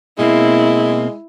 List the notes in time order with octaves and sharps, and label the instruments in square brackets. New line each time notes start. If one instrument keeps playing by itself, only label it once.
[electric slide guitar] B2 A#3 C4 [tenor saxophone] G#3 [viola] E4